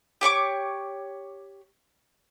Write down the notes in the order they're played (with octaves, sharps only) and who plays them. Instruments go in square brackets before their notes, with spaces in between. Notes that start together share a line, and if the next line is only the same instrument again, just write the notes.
[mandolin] G4 C#5 C#6 D6